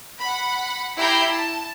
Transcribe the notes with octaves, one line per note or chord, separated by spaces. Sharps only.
F#5 B5
E4 G4 A#5 B5 G6 C7
A5